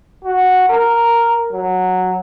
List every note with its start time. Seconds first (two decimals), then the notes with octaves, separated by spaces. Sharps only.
0.25 F#4
0.69 A#4
1.53 F#3